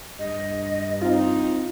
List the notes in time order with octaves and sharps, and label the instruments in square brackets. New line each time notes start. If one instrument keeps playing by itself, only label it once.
[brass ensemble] G2 [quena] D#5
[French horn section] C4 D#4 [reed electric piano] F4